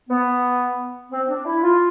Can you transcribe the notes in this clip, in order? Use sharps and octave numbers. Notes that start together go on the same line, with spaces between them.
B3
C4
D4
E4
F4